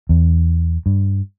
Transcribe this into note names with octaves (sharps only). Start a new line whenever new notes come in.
E2
G2